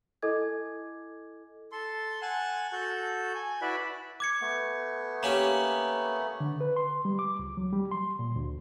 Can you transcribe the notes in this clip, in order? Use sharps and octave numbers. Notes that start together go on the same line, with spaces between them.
E4 A4 D#5 G#5 D6 G#6
A4 C6
F#5 G#5 A5 F#6
F#4 A4 G6
G#5
E4 F#4 B4 D5 E5 B5
D6 G#6 C#7
A3 B3
A#3 C#4 G4 A#5 F#7
D3
B4
C6
G3
D6
C#2
F#3
G3
C6
A#2
D2